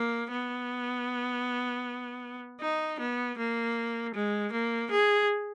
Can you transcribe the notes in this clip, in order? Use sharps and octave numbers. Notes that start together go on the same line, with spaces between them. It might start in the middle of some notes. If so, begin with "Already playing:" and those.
Already playing: A#3
B3
D#4
B3
A#3
G#3
A#3
G#4